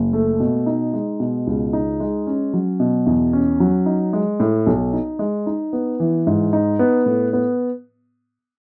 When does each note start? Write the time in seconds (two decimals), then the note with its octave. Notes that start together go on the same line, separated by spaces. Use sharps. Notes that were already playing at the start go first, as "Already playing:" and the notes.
Already playing: F#1
0.13 A3
0.40 B2
0.66 D#4
0.93 G#3
1.20 B2
1.47 C#2
1.73 D#4
2.00 G#3
2.27 C#4
2.53 F#3
2.80 B2
3.06 E2
3.33 C#4
3.60 F#3
3.86 D#4
4.13 G#3
4.40 A2
4.67 B1
4.93 D#4
5.19 G#3
5.47 D#4
5.73 B3
6.00 E3
6.27 G#2
6.53 D#4
6.79 B3
7.06 A2
7.33 B3